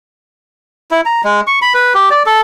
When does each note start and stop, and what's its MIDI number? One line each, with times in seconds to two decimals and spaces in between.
0.91 1.01 64
1.05 1.21 82
1.24 1.41 56
1.47 1.59 85
1.62 1.73 83
1.74 1.93 71
1.94 2.09 67
2.10 2.23 74
2.26 2.41 69